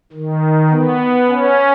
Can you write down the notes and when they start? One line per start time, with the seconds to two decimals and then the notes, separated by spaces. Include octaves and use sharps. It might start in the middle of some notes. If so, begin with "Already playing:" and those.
0.13 D#3
0.70 B3
1.28 C#4